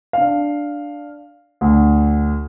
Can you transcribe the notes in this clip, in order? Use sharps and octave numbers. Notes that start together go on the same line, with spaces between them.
D4 F5
D2